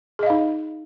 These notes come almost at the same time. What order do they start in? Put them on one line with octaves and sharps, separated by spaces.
G#4 D#5 F5 D#4